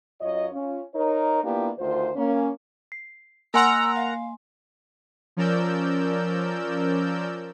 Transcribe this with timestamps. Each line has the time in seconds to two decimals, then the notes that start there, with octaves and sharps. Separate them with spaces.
0.20 F#2 F4 C#5 D#5
0.52 C#4 F4
0.95 D#4 A#4 C#5
1.43 A#3 B3 D4 E4 F4 G4
1.78 D2 D#3 F4 C5
2.16 A#3 C#4
2.92 C7
3.54 A#3 A#4 F#5 G#5 A#5 C6 E6
3.95 F5
5.37 F3 C#4 A#4 D5 E6 G6